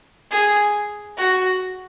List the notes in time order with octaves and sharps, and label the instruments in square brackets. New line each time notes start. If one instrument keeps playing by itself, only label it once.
[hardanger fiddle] G#4
F#4